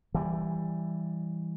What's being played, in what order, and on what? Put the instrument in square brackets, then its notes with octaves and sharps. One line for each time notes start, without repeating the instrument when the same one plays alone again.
[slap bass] E3 G3